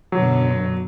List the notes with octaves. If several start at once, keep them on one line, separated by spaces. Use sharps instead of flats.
F#2 B2 D3 F#3